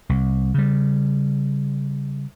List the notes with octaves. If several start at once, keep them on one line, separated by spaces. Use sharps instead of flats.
C2
C#3 G3